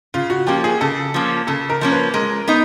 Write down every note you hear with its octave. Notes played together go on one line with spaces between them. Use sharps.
C#3 F4
F#4
F3 A#3 C#4 G4
G#4
C#3 A4
F3 A#3 C#4
C#3 A4
A#4
F3 A#3 C#4
B4
G#3 A#4
B3 D#4